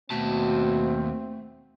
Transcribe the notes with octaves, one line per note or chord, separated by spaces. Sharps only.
D#2 B2 A3 C4 F#4 A5